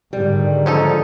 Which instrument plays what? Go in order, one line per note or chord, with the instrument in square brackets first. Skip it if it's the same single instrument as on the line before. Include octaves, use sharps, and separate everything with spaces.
[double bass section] G#2 D3 D#3 [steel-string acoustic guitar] G3
[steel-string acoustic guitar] F3 [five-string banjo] C#4 D#4 A4